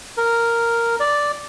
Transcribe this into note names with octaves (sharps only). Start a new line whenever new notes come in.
A#4
D5